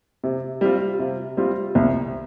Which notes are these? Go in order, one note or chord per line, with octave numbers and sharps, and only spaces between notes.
C3
G3 C4 F4
C3
G3 C4 F4
C2